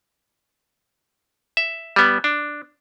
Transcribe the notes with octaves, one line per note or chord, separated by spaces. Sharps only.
E5
G3 B3
D4